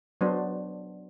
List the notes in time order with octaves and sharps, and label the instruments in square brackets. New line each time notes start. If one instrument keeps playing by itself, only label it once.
[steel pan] F#3 B3 D4 C5